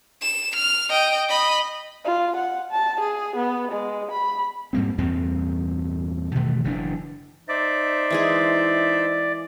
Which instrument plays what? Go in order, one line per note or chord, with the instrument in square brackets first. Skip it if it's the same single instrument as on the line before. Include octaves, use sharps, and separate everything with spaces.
[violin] E7
F6
D#5 G5
D#5 B5
[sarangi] F4
F#5
A5
G#4
B3
G#3
B5
[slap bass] G#2 G3 A#3 C4
E2 G2 A#2 C4
B2 D#3 E3 A3
F#1 E3 C#4 D4
[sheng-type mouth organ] D#4 C5 E5 [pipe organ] D5
[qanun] E3 G#3 G#4